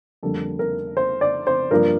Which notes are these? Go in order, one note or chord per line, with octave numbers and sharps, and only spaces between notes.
F2 D3 G3 A#3 A4
A#4
C5
D5
C5
G2 F3 A#3 A#4